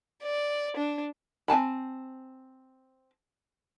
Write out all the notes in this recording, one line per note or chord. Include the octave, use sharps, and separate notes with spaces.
D5
D4
C4 G#5 A5 B5